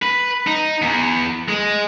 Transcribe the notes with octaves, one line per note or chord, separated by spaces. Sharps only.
B4
D#4
E2
G#3